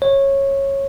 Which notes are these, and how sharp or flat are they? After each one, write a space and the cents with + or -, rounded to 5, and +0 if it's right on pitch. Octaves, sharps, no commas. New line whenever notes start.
C#5 -15